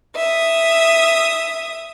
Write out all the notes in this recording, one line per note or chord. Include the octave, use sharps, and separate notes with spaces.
E5 D#6